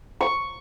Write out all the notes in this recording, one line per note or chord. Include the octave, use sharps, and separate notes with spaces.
C#6